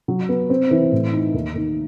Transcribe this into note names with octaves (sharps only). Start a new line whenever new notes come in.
F#3
B3
C4
E3
A2
D#4
D#2
D#2